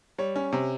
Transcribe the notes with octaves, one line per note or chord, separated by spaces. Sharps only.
G3 C#5
C#4
C3